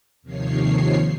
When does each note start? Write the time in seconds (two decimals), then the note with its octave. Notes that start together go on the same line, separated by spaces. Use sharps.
0.22 D#2 C3 D#3 F3 C#5 C7